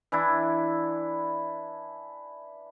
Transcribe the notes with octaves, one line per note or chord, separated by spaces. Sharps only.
E3 D4 E4